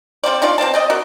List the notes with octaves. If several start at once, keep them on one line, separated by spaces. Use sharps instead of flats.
G3 A#3 C4 D5
C#4 D#4 F4 D5
C4 C5 D5 A5
C4 D5 D#5
F#4 A#4 D5